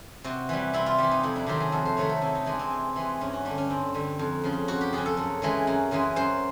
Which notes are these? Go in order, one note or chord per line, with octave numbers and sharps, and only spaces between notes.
C3 F#4
E3 G3
C3 E4
F4
E3 G3 G4
D#4
F2 E4
D4
C3 D#3 F#3 A3 G4
G#4
F2 A4
C5
C3 D#3 F#3 A3 C#5
A4
C3 E4
D#4
E3 G#3 D4
C4
C3
E3 G#3
G2 C#4
F#4
D3 G3 D4
C#4
G2 C4
D3 G3
F2
C#3 F3
F2 F#4
G4
C#3 F3 G#4
A4
F#2
C#3 E3 G#3
F#2
C#3 E3 G#3
F#2 C5